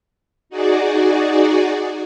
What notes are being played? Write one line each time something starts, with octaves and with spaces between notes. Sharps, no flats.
D#4 F#4 G#4 D5